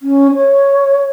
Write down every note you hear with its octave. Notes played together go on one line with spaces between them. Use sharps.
C#4
C#5